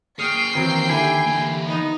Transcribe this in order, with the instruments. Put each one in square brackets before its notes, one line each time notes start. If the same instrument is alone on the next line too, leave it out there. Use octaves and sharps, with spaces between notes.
[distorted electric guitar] A#3 G#4 [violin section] G5 C7 [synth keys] C#6 D#6 F6
[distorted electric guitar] D#2 [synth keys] E3 F#3 C4 [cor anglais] A#4
[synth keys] D3 E4 G4 [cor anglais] G#5
[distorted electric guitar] E3 A#3
[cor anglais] B3 [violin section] D#4